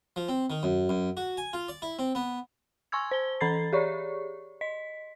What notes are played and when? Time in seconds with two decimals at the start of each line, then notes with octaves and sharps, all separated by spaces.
0.16 F3
0.29 C4
0.50 D#3
0.63 F#2
0.89 F#2
1.17 F#4
1.37 G#5
1.53 F4
1.68 D5
1.82 E4
1.99 C4
2.15 B3
2.92 G#5 C6 C#6 E6 G#6
3.11 C5 G7
3.41 E3 A4 A#5 B5 A6 C7
3.73 G4 G#4 C#5 D5 C#6
4.61 D#5 B6